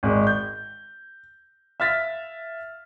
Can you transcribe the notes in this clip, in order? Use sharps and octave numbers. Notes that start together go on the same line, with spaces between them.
G#1 G#3 D5
G6
E5 F5 F6 A6 B6